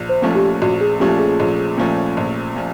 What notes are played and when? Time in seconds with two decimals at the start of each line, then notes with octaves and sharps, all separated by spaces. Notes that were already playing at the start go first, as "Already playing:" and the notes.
Already playing: A#1
0.09 C5
0.22 A#2 F3 A3 C#4
0.35 G4
0.62 A#1 F#4
0.81 G#4
1.00 A#2 F3 A3 C#4 G4
1.19 G#4
1.40 A#1
1.78 A#2 F3 A3 C#4
2.17 A#1
2.56 A#2 F3